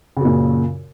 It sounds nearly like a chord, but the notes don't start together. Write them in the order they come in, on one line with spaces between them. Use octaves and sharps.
C#3 F#2 A#2